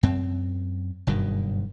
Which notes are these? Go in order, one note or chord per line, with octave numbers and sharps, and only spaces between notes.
F#2 C4
F#1 G2 B2 D#3